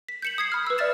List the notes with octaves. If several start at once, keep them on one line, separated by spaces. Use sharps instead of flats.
B6
G6 B6 C#7 E7 F#7
D#6 G#6 C7
B5 F6
B4 E6
D5 E5 F6 A6 E7